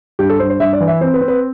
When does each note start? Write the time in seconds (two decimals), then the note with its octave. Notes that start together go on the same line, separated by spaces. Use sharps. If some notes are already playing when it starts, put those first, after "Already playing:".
0.19 G2 G4
0.30 A4
0.39 G2 C5
0.50 C5
0.60 G2 E5
0.73 D5
0.80 E3
0.88 E5
1.01 C4 C5
1.14 B4
1.21 C4
1.28 B4